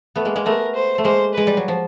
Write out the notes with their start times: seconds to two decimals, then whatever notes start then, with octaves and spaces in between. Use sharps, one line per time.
0.16 A3 B3
0.25 G#3 A#3
0.36 G#3 A#3
0.45 A3 B3 A#4
0.75 C5
0.98 A3
1.04 G#3 A#3 C5
1.34 G#3 B4
1.47 G3
1.57 F#3
1.68 F3